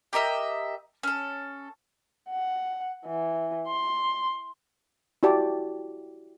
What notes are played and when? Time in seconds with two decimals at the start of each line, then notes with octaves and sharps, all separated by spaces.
0.13 G4 A#4 D#5 E5
1.03 C#4 A4
2.30 F#5
3.06 E3
3.68 C6
5.23 E4 F#4 G4 D5 A5